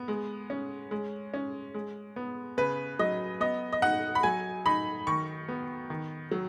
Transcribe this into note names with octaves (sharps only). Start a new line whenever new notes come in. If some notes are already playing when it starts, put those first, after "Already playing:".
Already playing: B3
G#3
C#4
G#3
C#4
G#3
B3
C#3 B4
F#3 D#5
B3 D#5
D#5
D#4 F#5
B5
F#3 G#5
D#4 B5
D#3 C#6
B3
D#3
F#3